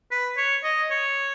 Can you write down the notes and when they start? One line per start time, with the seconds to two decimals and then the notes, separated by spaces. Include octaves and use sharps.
0.11 B4
0.37 C#5
0.64 D#5
0.91 C#5